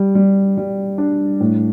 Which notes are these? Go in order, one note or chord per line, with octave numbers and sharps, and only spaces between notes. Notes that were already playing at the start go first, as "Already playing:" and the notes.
Already playing: G3
G3
G3
D4
A2